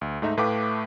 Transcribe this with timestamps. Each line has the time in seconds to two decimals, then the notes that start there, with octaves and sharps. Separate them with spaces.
0.01 D2
0.22 G#2 A3 D#4 E5
0.37 A2 A3 B4 F5 G5 D6